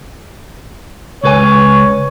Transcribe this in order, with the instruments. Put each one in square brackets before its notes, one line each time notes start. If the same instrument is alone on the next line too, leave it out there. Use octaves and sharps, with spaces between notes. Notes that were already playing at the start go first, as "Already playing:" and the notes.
[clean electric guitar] C#2 B4 G#5 [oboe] C#5